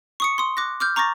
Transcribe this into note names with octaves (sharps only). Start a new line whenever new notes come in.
C#6 D#6 C#7
C6 D#6
D6 F#6 A#6
D6 F6 G6
A#5 C#6 D6 A6 A#6